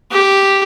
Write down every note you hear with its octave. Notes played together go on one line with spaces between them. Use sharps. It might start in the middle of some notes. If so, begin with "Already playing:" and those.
G4